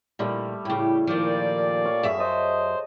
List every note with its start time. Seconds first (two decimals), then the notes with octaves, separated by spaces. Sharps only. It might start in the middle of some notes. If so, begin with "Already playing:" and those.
0.19 A#2 D3 F3 G3 A3
0.65 A2 C#3 G4
1.07 A#2 D#3 F3 D5
1.85 C#5 F5
2.03 F#2 G#4 E5
2.19 C5 D#5 A5